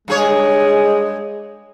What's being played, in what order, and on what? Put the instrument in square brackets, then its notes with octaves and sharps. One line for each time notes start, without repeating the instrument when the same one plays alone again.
[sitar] G2 G#4 C#5 [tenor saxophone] G#3